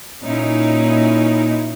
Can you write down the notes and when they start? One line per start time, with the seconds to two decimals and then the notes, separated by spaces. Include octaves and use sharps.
0.24 A#2 C#4 D#4 E4